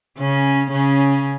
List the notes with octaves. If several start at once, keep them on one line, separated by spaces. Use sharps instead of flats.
C#3 C#4
C#3 C#4